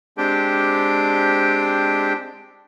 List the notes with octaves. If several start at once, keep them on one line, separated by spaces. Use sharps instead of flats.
G#3 C4 D4 G4 G5